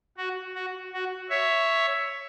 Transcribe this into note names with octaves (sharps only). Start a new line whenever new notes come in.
F#4
F#4
F#4
C#5 E5